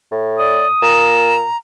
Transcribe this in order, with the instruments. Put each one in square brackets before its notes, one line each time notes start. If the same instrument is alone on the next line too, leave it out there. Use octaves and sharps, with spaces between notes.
[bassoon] A2
[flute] D5 [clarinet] D#6
[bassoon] A#2 [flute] A#5 [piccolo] E7